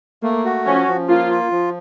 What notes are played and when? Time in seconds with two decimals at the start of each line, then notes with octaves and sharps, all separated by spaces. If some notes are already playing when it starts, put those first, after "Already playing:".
0.23 A3 A#3
0.45 F#4
0.66 F3 C#4
0.88 F3
1.09 A#3 F4
1.30 F4
1.51 F3